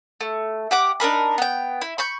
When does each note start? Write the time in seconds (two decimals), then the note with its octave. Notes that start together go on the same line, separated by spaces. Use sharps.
0.21 A3
0.71 G4 F#5 D6
1.00 D4 D#4 A#4 B5
1.38 B3 G5
1.82 E4
1.98 B5 C#6 G6